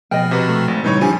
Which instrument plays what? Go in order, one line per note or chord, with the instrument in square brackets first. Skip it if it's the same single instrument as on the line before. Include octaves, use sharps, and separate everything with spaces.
[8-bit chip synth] B2 F3 F6 [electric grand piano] B3 [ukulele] D#5 G5
[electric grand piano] C3 F#4 B4
[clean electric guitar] A3
[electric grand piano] G#1
[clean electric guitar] A#2 C#3 G3 [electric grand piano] E3 D#4 C#5
[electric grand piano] F2 F3 [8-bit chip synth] D4 E4 G4 [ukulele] G#5